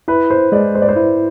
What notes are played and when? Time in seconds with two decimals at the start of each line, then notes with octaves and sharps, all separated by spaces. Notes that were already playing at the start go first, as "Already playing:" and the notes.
0.08 E4 B4
0.30 C5
0.52 G#3 D5
0.75 C5
0.82 D5
0.89 C5
0.96 E4 B4